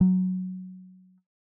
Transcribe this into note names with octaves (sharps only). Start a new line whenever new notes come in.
F#3